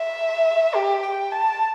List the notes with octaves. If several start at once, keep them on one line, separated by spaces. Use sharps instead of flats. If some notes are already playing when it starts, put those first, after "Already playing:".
Already playing: E5
G4
G5
A5